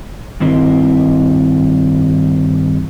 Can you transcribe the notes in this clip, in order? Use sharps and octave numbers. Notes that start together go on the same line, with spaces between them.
G2 D#3 C4 E4 A#4 D#5